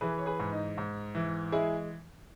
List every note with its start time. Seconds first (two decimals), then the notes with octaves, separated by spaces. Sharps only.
0.01 E3 G#4 B4
0.18 C#5
0.26 G#4 B4
0.39 G#2
0.52 D#4
0.78 G#2
1.15 E3
1.52 G#3 E4 G#4